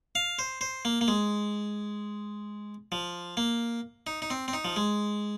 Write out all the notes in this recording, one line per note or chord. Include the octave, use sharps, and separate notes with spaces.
F5
C5
C5
A#3
A#3
G#3
F3
A#3
D#4
D#4
C4
C4
D#4
F3
G#3